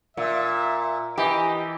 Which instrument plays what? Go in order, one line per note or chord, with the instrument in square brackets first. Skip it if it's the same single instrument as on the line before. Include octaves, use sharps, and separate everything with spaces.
[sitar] A#2 [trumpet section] E5
[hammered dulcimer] E3 [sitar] G4 [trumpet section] D#5